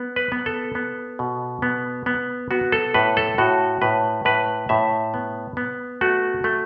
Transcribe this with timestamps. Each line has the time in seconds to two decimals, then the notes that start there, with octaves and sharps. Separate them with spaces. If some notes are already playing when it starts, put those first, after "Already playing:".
Already playing: B3
0.16 B4
0.32 B3
0.46 A4
0.75 B3
1.19 B2
1.62 B3
2.06 B3
2.51 B3 F#4
2.72 A4
2.94 A2 B4
3.17 A4
3.38 A2 F#4
3.82 A2 B4
4.25 A2 B4
4.69 A2 E5
5.14 B3
5.57 B3
6.01 A3 F#4
6.44 A3